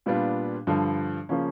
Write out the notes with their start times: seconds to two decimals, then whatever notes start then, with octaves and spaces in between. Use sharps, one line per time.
0.06 A#2 G3 B3 D4 F4
0.67 G2 D3 F3
1.29 C#3 F3 A#3 C#4